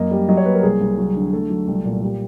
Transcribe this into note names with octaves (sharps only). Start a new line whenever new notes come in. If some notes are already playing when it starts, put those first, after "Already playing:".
Already playing: F#2 A#3 D#5
G3
F#3 D#5
C#5
A#3 B4
A#4
C2 G#4
C2
F#3
D3
A3 A4
F#3
C2
A#2
G3